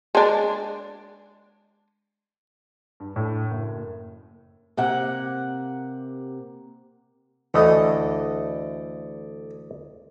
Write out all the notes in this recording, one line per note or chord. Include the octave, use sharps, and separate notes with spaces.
G#3 D4
G2
A2
F#1
C3 A#3 F#5
D2 D3 E3 A3 D#5